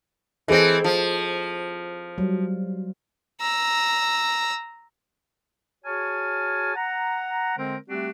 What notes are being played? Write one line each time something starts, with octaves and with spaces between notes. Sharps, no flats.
E3 C4 G#4 A4 D#5
F3
F#3 G3
A#5 E6
F#4 G#4 C#5 G#5 A5 F6
F#5 A#5
D3 G#3 C4 A#4 C5
G3 A3 C4 D4 F#4 G4